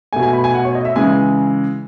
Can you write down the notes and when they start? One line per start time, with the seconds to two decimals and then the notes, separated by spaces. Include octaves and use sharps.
0.13 B2 A3 G#5
0.23 G#5
0.33 B5
0.44 G#5
0.54 F#5
0.65 C#5
0.75 D#5
0.85 E5
0.96 C#3 E3 G#3 G#5